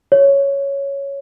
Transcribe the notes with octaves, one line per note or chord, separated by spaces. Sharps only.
C#5